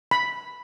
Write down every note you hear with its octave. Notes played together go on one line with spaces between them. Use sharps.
B5